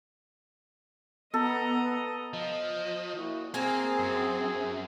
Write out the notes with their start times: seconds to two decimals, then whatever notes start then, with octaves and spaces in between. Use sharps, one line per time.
1.34 B3 A4 D#5 A#5
2.33 F3 D#5
3.15 A#2 E4 F#4
3.54 A#3 C4 G#4 A#4 G#5
3.99 F#2